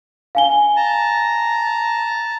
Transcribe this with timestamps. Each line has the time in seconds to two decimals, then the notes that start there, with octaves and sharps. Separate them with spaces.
0.35 F5 G#5 G7
0.76 A5 A#5